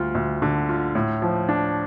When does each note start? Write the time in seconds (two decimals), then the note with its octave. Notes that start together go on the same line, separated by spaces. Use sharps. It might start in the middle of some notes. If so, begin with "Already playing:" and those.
Already playing: D2 G3 F4
0.15 D2
0.42 D3
0.69 F4
0.95 A2
1.22 F3
1.49 D4